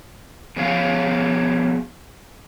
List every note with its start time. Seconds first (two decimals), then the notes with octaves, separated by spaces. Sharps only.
0.56 B2 F3 G#4 C#5 F5